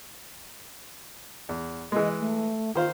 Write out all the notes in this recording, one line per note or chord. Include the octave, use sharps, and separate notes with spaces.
E2
E3 G#3 D#5
A3
D#3 F4 C5 F5